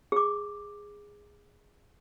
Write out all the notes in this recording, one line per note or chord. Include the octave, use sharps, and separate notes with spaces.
G#4 D6